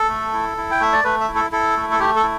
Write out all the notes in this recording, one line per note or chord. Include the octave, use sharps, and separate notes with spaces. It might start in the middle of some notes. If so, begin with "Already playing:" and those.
Already playing: A4
A3
E4
E4
G5
A3 E5
D5
A3 B4
E5
E4
A4
E4 A4
A3
A4
A3 G4
A4
E4